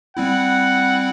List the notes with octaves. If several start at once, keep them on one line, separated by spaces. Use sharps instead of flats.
G3 C4 E4 F#5